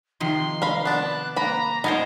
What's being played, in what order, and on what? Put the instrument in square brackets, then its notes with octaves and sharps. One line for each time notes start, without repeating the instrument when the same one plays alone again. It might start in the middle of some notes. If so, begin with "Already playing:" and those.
[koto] C3 D#3 F3 [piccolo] C6
[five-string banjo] A#4 F5 B5
[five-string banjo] B3 D4 [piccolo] A5
[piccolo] F#6
[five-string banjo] A#3 B5 [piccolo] A#5
[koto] B3 C#4 C5 [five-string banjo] D#4 A#4 [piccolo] A#5